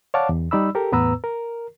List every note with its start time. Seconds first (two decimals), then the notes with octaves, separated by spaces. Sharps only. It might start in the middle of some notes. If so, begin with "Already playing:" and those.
0.14 C#5 D5 F5 F#5 A5 D6
0.29 E2
0.51 G3 D#4 D5 B5 E6
0.75 G4 A4 A#4
0.92 E2 A2 B3 B4 A#5 E6
1.24 A#4